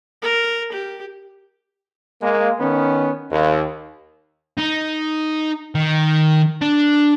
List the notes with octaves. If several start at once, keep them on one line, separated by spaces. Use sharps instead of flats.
A#4
G4
G#3 A#3
D#3 B3 C#4
D#2
D#4
D#3
D4